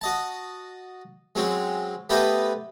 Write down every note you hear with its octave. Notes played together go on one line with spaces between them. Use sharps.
F#4 D#5 A5
F#3 G#3 C4 C#4 F#4
A3 B3 G4 B4 C5 D#5